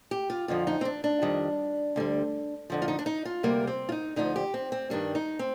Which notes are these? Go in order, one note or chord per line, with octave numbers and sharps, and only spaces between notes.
G4
F4
F2 D3 F3 F4
D#4
C4
D4
D4
F2 D#3 G3
D2 D3 G3
F2 D3 F3
F4
D#4
D4
D#4
F4
D2 C3 G3 A#3
C4
F4
D#4
D2 D3 F3 D#4
G4
C4
C4
G2 D#3 G3 D4
D#4
C4